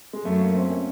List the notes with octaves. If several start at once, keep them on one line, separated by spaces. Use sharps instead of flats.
G#3
F#2 A3
A#3
C4
C#4